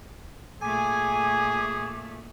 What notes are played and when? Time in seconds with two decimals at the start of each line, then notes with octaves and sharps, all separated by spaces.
0.62 A#2 A3 G#4 G#5 D6